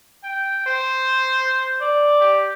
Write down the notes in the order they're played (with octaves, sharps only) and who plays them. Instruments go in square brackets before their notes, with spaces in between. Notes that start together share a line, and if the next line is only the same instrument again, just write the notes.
[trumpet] G5
C5
[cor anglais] D5
[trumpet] G4